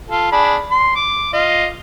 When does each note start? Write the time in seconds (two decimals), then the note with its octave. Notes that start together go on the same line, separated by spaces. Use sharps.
0.10 F4 A4
0.32 D4 G#4 B5
0.71 C6
0.96 D6
1.33 F4 D#5